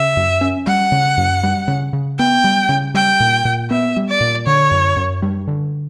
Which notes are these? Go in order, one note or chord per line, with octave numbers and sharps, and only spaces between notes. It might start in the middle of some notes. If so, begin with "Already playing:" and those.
Already playing: C#3 E5
F#2
C#4
G3 F#5
C#3
F#2
G3
C#3
C#3
B3 G5
G3
C#3
G3 G5
A#2
A#2
B3 E5
G3
D5
A#2
D3 C#5
F#2
F#2
G3
D3